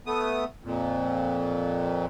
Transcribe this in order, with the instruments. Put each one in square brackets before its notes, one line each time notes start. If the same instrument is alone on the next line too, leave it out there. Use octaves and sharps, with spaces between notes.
[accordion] A3 B3 D#6
F2 A#2